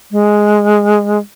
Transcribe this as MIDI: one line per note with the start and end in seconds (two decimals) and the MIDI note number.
0.12 1.19 56